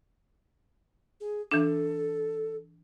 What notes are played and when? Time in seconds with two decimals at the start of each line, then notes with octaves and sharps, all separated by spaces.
1.21 G#4
1.51 E3 D4 A4